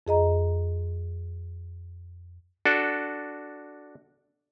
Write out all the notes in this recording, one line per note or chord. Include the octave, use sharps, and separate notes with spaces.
F2 G#4 D#5 A#5
D4 F#4 A4